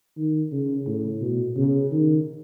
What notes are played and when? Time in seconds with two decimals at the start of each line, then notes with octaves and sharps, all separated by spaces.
0.17 D#3
0.52 C#3
0.87 A2
1.21 B2
1.56 C#3
1.92 D#3